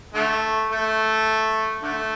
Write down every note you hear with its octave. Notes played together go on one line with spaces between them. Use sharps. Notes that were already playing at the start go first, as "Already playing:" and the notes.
D3 A3
A3
D3 A3